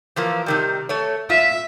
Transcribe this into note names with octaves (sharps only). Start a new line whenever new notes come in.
E3 F3 A#3
C3 D#3 G3
A3 C#5
F4 E5